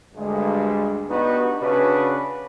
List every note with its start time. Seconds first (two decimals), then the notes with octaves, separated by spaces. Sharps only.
0.15 D2 G2 G#3
1.09 B3 D4 D#4 F#4 G4 B4
1.60 C#3 C#4 D4 F#4 B4